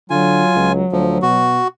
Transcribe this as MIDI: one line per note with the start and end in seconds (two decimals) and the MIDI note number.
0.10 0.43 50
0.10 1.56 54
0.10 0.72 65
0.10 0.72 80
0.55 0.82 37
0.92 1.20 38
0.92 1.18 53
1.22 1.60 47
1.22 1.68 66